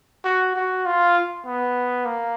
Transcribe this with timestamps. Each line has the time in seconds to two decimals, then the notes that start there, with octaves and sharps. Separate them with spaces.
0.25 F#4
0.55 F#4
0.86 F4
1.46 B3
2.05 A#3